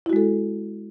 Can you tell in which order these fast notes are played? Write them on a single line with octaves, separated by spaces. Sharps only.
E4 F#4 G#3 A4